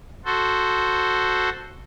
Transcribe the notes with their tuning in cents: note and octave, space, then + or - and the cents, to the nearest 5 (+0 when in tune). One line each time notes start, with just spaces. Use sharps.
F#4 +0 A4 +0 C5 +0